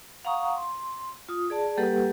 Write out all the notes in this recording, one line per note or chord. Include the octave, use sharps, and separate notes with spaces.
F5 F#5 A#5 C#6 D#6
C6
F4 D#6
G#4 D5 A5
G3 A#3 G4 A4 B4 F#5